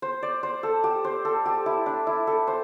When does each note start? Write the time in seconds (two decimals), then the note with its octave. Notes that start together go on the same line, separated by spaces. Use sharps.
0.02 C5
0.23 D5
0.43 C5
0.63 A4
0.84 G4
1.04 C5
1.25 A4
1.45 G4
1.66 E4
1.86 D4
2.07 E4
2.27 A4
2.47 C5